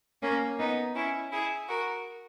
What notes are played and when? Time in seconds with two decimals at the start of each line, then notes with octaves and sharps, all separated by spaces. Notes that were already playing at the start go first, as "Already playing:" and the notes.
0.22 A#3 C#4
0.58 B3 D#4
0.95 C#4 E4
1.32 E4 G#4
1.69 F#4 A#4